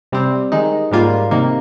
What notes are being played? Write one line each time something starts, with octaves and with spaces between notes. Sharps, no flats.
C3 G3 C4
D#3 G#3 D#4
G#2 G3 A#3 F4
C3 D#3 A#3